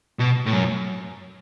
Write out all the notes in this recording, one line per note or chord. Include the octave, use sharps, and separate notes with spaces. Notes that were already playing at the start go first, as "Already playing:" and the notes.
B2
A2
F#2